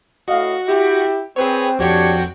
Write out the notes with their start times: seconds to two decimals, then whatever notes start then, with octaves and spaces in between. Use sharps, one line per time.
0.28 A2 F#4 D#5 F5
0.67 E4 G4
1.36 C4 G#4 B4 C#5
1.79 F2 D4 F#4 G4 C#5 G5